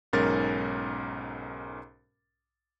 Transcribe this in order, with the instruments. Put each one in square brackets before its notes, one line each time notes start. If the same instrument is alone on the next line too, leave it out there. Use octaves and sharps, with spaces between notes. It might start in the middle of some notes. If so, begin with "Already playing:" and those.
[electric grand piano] B1 G#2 C#4 A#4 A6